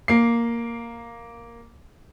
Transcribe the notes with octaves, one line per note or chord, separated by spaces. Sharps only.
A#3 C7